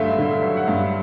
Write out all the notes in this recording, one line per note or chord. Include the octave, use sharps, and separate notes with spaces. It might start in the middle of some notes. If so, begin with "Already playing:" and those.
Already playing: G2 D3 F#3 A3 E5 F5
D3
F#3
F#5
G2 F5